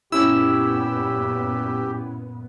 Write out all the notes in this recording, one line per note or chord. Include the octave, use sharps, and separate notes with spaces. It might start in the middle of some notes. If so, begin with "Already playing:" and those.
F#2 A#2 B3 C#4 E4 G4 E6